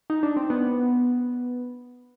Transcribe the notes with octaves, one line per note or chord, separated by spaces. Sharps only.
D#4
D4
C4
B3